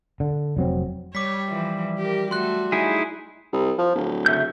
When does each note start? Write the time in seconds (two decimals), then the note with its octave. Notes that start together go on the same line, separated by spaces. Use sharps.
0.20 D3
0.57 F1 F#3 C4
1.15 G3 C#5 D6 B6
1.49 E3 F3
1.99 G4 A#4
2.31 F#3 A3 F#4 C6 F#6
2.72 D#4 E4 G#4
3.52 C2
3.78 F3
3.95 D1
4.26 C#3 E5 G6